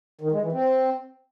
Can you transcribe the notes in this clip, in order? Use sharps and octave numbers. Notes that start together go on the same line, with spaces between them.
D#3
G#3
E3
C4